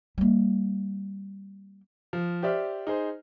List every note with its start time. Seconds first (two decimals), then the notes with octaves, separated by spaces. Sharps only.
0.18 G3 A#3
2.13 F3
2.43 G4 C5 D5 E5 F6
2.87 D#4 G#4 C5